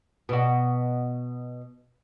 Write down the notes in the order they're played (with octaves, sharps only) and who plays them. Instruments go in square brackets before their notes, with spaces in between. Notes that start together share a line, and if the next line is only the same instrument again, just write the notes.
[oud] B2 F#4